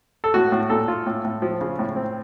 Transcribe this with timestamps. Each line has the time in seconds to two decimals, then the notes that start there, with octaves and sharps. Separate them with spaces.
0.24 A4
0.34 A2 F#4
0.52 A2
0.70 A#2 A4
0.88 F4
1.06 A2
1.24 A2
1.42 F3
1.61 C#3
1.79 A2
1.96 C4